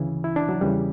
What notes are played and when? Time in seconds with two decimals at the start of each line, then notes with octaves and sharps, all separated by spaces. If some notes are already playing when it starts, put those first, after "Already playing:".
Already playing: D2 C#3 E3
0.24 E4
0.36 D4
0.49 F#3
0.61 E2 C#3 E3 G3